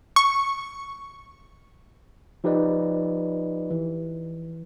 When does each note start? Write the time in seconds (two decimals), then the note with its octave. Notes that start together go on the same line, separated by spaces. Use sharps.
0.16 C#6
2.44 F3 D#4 G4 B4 D5 D#5
3.70 E3